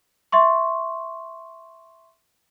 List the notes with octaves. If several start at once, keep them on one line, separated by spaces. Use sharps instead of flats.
E5 C6 C#6